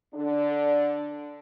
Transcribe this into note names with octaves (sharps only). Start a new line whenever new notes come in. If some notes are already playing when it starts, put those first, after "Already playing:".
D3 D4